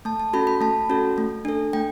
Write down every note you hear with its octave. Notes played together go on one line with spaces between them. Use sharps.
A3 A5
A5
C#4 F#4 A4 B5
B5
A3 A5
C#4 F#4 A4
A3
D4 A4
A3 G5